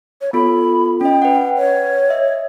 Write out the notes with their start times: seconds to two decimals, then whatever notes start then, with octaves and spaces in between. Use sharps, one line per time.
0.21 C#5
0.33 B3 F4 A4 B5
1.01 C#4 D#5 G5
1.22 B4 F#5
1.57 C#5
2.09 D#5 E5